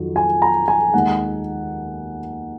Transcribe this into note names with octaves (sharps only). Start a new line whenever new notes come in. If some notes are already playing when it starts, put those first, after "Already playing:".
Already playing: F2 D#3 F#3
G#5
A#5
G#5
D#2 D#3 G#3 F#5